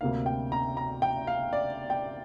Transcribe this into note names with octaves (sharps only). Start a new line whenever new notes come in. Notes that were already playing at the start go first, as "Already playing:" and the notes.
D2 C3 A#3 D4 F5
G5
A#5
A#5
G5
F5
D5
G5